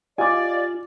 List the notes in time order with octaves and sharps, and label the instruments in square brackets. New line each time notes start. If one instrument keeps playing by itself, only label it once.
[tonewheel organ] F4 [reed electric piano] G4 D#5 F5 [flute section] D5 [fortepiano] G#5 D6